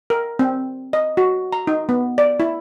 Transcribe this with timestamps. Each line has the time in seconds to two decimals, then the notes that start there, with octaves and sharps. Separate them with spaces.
0.10 A#4
0.39 C4
0.93 D#5
1.17 F#4
1.53 A#5
1.67 D#4
1.89 B3
2.18 D5
2.40 E4